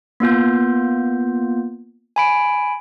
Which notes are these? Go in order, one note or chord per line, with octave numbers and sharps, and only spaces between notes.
A#3 B3 F4 G6
G#5 B5 D7